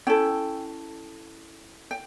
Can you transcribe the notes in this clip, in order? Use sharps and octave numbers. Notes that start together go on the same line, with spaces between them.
C#4 E4 A4 G5
G5